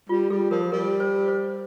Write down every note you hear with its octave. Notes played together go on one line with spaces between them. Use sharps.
G3 F4
G3 G#4
F3 A#4
G3 A#4
C5
C5